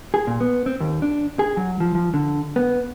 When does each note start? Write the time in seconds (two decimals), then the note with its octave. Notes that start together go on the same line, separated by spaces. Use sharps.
0.14 G#4
0.27 A#2
0.40 B3
0.66 C4
0.80 D#2
1.02 D4
1.39 G#4
1.57 F#3
1.80 F3
1.95 F3
2.14 D3
2.56 B3